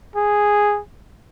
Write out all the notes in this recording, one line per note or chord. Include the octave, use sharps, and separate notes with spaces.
G#4